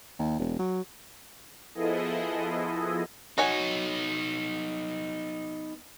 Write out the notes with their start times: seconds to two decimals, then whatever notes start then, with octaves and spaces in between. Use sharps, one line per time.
0.19 D#2
0.39 E1
0.59 F#3
1.74 F3 B3 E4 G#4 A4 D#5
3.38 B3 D#4 F#4 C#5 G#5